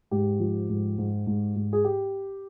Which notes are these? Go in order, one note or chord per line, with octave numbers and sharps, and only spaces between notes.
G#2 G4
F3
G#2
G#2
G#2
G#2
G#4
G4